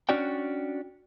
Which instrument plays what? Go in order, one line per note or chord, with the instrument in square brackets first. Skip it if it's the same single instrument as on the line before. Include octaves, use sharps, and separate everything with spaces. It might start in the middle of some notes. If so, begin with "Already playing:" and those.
[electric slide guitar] C#4 D4 F#4 D5 G5